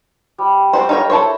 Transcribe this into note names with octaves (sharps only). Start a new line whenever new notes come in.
G3
C4 F#4 C5
D#4 A4 A#4 C#5 F5 G5
E4 A4 C5 C#5